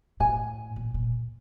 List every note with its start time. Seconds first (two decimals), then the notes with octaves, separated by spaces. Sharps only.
0.20 A2 G#5
0.76 A#2
0.94 A#2